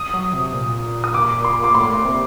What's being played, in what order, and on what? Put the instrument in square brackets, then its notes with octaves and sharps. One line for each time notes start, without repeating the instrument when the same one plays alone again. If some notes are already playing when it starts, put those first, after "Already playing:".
Already playing: [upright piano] D#6
[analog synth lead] F#3
C3
A#2
[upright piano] D#6
D6
C6
D6
[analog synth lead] A2 [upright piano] C6
[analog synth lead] A#2
C3